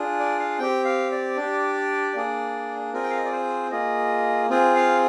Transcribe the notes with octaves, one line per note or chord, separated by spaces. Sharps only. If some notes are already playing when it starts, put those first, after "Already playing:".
Already playing: D4 F4 G#4
D5
F5
C4 G4 G5
F5
D5
D4 G4
A#3 D4 G#4
C4 F4 G#4 A#4
G5
F5
D#5
D5
C5
A#3 F4 G#4 D#5
C4 F4 G#4
F5